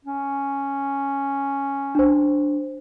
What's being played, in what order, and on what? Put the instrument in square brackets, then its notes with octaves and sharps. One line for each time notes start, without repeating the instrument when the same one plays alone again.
[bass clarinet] C#4
[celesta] D4 C5